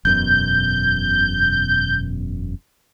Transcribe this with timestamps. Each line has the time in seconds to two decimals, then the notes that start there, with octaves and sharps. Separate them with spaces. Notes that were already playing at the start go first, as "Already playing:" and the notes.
0.05 E1 F#2 B2 G6